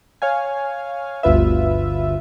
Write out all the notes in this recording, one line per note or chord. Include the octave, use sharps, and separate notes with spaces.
C#5 F5 G#5
G1 D2 F4 B4 E5